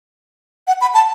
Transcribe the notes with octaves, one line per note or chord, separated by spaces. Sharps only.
F#5
B5
A5